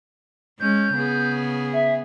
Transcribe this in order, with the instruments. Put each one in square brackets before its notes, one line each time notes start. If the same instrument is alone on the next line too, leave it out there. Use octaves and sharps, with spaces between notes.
[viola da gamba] G#3 C#4 [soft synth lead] G6
[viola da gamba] C#3 B3 G#4
[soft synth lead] E5